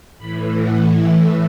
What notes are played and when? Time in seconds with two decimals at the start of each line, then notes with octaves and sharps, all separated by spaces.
0.18 A2 E3 B5
0.57 F#5
0.95 E5